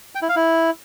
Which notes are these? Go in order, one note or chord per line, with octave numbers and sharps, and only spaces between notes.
G5
E4
F5
E4